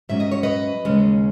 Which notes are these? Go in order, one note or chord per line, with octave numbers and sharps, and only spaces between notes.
G#2 F#3 C#4 E5
D#5
C#5
B4 D#5
D#2 C#3 G#3 C#4